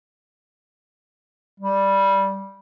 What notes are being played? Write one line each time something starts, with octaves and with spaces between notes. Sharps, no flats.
G3